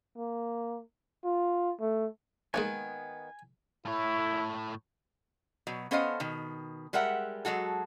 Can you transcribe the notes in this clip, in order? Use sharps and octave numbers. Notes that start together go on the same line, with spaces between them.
A#3
F4
A3
D#3 E3 G#3 A#3 B3 G#5
A2 E4 C#5
B2 F#3
B3 C#4 A4 C5 D#5 F5
B2 D#3
G3 G#3 A#4 E5 F#5
F#3 G#3 F#4 A4